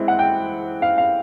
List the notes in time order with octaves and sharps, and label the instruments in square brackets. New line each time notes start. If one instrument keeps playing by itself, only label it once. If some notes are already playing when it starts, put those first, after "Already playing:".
Already playing: [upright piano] E3 G#3 C4
F#5
G5
F5
F5